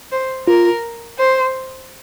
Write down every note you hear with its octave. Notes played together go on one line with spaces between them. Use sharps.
C5
F4 A#4
C5